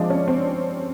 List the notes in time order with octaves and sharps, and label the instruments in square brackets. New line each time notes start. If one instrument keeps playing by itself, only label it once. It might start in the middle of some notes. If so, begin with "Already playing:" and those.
Already playing: [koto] F3 G#3 [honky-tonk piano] C4 D4
[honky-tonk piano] C#4
C4